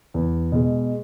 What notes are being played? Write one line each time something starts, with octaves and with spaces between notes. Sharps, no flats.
E2
B2 G#3